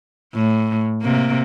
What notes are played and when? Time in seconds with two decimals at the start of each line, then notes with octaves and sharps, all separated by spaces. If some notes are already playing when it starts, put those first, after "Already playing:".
0.35 A2
1.02 C3 A#3